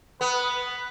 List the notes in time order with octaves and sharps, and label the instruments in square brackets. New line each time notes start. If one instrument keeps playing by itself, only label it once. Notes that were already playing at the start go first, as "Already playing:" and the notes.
[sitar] B3 [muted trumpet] B4